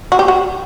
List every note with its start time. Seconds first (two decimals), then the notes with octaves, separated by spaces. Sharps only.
0.12 F#4
0.19 G4
0.28 F#4